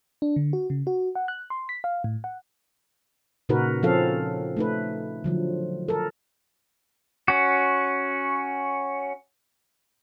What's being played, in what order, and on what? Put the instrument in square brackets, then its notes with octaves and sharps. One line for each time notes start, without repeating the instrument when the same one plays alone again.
[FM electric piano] D4
D3
F#4
C#3
F#4
F#5
F#6
C6
B6
F5
A2
F#5
[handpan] A#2 C#3 D#4 F#4 A#4 B4
F3 C4 C#4 A4 F5
A3 D#4 B4
D3 F3 F#3
A4 A#4
[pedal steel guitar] C#4 F#4